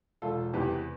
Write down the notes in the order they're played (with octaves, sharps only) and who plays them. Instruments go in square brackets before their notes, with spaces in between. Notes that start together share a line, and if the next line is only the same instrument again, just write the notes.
[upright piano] E1 F4 A4
E2 C3 G4 B4